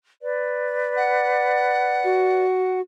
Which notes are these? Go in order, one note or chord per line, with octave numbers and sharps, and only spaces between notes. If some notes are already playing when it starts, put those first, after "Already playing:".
B4 D5
F#5
F#4